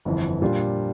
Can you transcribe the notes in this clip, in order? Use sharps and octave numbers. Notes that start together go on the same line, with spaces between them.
G1 F2 E3
A#2 G3 D4 F4